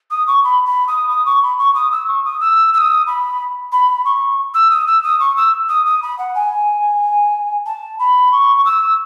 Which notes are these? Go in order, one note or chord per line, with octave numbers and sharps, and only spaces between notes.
D#6
C#6
B5
B5
D#6
D#6
C#6
B5
C#6
D#6
E6
C#6
D#6
E6
E6
D#6
B5
B5
C#6
E6
D#6
E6
D#6
C#6
E6
D#6
D#6
B5
F#5
G#5
A5
B5
C#6
E6